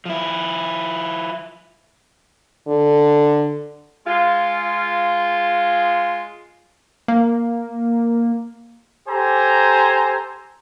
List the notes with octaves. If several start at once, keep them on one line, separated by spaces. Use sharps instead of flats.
F3 E4
D3
G#3 F4
A#3
G4 A4 C5 G#5 A#5